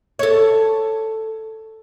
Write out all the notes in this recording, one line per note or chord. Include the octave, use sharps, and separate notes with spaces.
A4 C#5